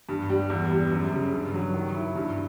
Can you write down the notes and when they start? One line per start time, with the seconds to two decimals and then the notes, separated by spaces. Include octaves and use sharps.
0.09 G2
0.30 G3
0.50 E2
0.71 G3
0.91 F#2
1.13 C#3
1.33 G2
1.54 F#3
1.74 D#3
1.95 E4
2.15 G2